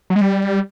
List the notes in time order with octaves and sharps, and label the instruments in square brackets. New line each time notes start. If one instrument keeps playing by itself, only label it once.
[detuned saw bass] F#3
G#3
G3